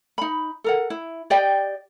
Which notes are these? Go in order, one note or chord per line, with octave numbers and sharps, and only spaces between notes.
D#4 B5
A4 A#4 F#5
E4
G4 D5 D#5 G5